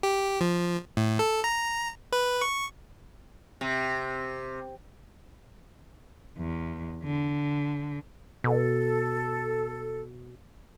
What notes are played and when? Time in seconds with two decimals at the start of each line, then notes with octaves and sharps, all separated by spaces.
0.03 G4
0.41 F3
0.97 A2
1.19 A4
1.44 A#5
2.13 B4
2.41 C#6
3.61 C3
6.38 E2
7.03 D3
8.44 B2 A4